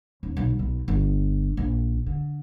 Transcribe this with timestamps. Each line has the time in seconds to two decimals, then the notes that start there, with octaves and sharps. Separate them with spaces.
0.23 D#1
0.37 B1
0.59 B1
0.88 G1
1.57 A#1
2.07 D3